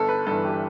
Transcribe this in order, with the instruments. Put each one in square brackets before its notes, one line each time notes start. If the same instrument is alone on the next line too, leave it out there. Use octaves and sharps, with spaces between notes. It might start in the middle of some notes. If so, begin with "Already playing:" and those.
Already playing: [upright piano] G1 A4
B4
G2 A4
E3
G4